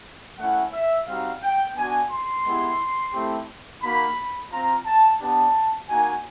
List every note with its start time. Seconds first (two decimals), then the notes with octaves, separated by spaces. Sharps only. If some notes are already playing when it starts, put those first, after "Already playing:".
0.39 A3 C#4 E4 F#5
0.73 E5
1.07 G3 C4 D#4 F#4 F5
1.43 G5
1.76 B3 D4 F#4 G#5
2.10 C6
2.45 G#3 B3 E4 G4
3.13 A3 C4 E4 G4
3.82 A#3 D#4 F#4 B5
4.51 C4 F4 A#5
4.86 A5
5.20 B3 D4 G4 A5
5.89 A#3 D#4 F#4 G#5